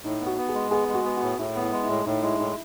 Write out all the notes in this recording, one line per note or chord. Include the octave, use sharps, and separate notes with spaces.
A2 D#4
B3
F#4
B3
G#4
G#3
B3 G#4
G#3
F#4
B3
F#4
A2
A2 E4
B3
E4
G#3
E4
A2
A2 D#4
G#3 E4
A2 E4